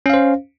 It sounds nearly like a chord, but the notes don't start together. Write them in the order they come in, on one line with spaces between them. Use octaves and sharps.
C#4 F5 C5